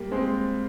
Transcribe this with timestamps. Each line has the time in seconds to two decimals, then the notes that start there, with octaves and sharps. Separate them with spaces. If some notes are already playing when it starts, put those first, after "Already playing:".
Already playing: G3 A#3
0.12 G#3 C4